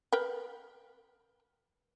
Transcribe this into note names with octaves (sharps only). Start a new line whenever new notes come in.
A#4 B4 G5